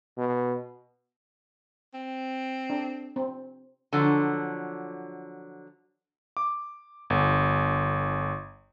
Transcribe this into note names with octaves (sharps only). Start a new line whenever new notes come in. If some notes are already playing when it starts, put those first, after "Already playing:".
B2
C4
D4
C4
D3 F3 F#3
D6
G1